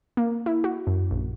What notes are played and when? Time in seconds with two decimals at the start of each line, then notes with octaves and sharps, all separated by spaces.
0.17 A#3
0.46 E4
0.64 F#4
0.87 F#2
1.11 A#1